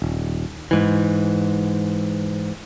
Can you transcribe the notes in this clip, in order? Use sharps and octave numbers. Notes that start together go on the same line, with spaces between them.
D#1
G#2 E3